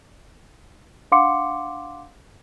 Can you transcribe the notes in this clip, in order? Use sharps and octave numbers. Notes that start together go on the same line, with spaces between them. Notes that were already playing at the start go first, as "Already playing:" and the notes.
D4 F5 F#5 C6 D6 C#7